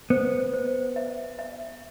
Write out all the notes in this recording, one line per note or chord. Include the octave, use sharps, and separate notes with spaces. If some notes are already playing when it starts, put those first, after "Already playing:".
B3 C5
C5
E5
E5